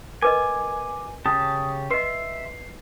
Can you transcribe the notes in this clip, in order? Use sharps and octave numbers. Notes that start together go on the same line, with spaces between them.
A#4 B4 D#5 G#5 D6
C#3 G4 A5 D#6
B4 D#5 E5 C6 C7